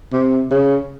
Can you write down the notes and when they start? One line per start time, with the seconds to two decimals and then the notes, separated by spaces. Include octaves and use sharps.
0.13 C3
0.51 C#3